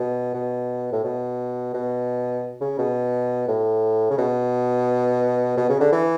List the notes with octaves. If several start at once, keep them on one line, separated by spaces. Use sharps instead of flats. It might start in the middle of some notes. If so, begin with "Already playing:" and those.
Already playing: B2
B2
A2
B2
B2
C#3
B2
A2
C#3
B2
B2
C#3
D3
E3